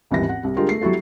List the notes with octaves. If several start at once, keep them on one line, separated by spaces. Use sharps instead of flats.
D#1 G#1 E3 G3 A#6
F#5
C2 G3
D3 G3 G#3 F4 G4 A#4
A3 C7
F#3 G3 E4 F#4 A4